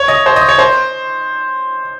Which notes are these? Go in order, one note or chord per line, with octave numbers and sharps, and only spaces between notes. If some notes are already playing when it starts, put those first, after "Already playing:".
Already playing: C#5
D#5
C5
D#5
C#5
C5